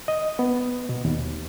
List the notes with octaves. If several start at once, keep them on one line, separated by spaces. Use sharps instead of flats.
D#5
B3
B2
D#2